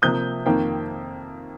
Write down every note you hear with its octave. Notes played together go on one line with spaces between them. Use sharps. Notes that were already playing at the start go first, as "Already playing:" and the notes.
C3 F3 A#3 D#6 G6
F2 D#3 A#3 G5